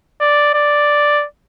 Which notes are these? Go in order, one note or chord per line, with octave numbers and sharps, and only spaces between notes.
D5
D5